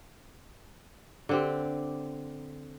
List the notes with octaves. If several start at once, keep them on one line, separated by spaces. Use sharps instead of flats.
D3 C4 G4